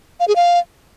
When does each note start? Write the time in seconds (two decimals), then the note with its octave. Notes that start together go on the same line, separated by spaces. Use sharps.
0.20 F5
0.28 G#4
0.36 F5